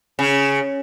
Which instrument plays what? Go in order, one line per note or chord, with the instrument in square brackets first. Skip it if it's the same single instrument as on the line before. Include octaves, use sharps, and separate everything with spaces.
[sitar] C#3